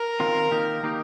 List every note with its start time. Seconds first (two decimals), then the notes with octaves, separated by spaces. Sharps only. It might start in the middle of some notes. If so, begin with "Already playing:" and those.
Already playing: A#4
0.20 D#3 C4 F4
0.51 D#3 A#3 D#4 G4
0.83 D#3 A#3 D#4 G4